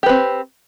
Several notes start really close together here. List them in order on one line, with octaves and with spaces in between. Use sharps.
G4 B4 C4